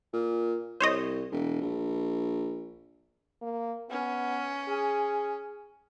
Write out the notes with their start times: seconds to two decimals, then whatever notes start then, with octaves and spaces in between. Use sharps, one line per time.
0.13 A#2
0.80 C2 C5 C#5 D#5
1.32 E1
1.61 A#1
3.42 A#3
3.90 B3 C#4
4.69 G#4